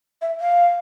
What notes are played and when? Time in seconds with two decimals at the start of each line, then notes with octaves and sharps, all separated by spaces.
0.22 E5
0.40 F5